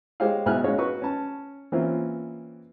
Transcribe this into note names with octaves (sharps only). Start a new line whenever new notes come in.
G#3 G4 C5 C#5 D#5 F5
B1 G#2 E4 G#5 F6 F#6
G#3 C#4 F#4 C#5 F5
F#4 B4 C#6
C#4 A5
E3 A#3 C4 C#4 E4 F4